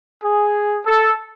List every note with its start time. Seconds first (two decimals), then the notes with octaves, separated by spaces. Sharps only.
0.22 G#4
0.84 A4